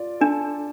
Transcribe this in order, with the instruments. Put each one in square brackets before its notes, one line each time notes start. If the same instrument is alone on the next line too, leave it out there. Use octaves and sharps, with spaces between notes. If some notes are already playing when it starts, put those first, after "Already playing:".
Already playing: [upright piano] F4 D5
[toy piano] D4 [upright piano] A4